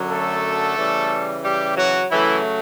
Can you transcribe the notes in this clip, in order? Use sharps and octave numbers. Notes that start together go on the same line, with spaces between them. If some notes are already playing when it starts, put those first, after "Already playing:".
Already playing: F#2 D3 F#3
A3 A4
C#3 E3 G3
G3 G4
F#3 F#4
C#3 E3 F#3 A3 E4